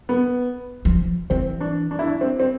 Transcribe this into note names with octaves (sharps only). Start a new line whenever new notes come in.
B3
F3
E3 C4
D4
D4
E4
D4
C4
C4